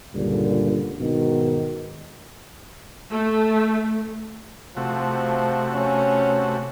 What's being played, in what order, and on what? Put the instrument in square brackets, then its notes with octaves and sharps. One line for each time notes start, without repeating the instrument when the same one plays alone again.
[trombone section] C#2 G2 A#2 D3
G#2 B2 D#3
[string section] A3
[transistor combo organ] C3 A3 F#4 [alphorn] F3
[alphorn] C#4